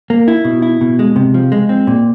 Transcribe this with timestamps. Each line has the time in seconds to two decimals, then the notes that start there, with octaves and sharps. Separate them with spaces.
0.10 A#3
0.28 E4
0.45 B2
0.62 E4
0.81 B2
0.99 G#3
1.16 C3
1.34 F3
1.52 G#3
1.69 C4
1.87 A#2